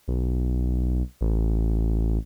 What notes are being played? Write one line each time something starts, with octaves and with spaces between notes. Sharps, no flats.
B1
A1